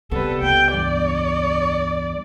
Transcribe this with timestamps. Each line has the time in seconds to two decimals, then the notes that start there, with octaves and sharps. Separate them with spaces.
0.11 E1 C3 G3 B3 A4 B4
0.42 C#2 G5
0.73 E2 G2 D5